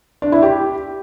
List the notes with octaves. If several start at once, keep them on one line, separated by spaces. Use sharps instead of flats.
D4
E4
G4